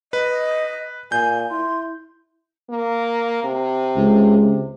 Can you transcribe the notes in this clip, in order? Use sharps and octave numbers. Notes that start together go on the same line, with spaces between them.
B4 D#5
A#2 G#5 G6
E4 C6
A#3
C3
C#2
C3